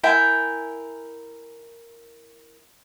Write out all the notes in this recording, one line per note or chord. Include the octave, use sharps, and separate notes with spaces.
E4 A#4 G5 G#5